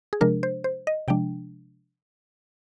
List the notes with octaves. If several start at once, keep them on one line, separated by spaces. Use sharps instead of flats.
G#4
C3 F3 G#3 D4 A#4
C5
C5
D#5
C3 F3 G#3 D4 G5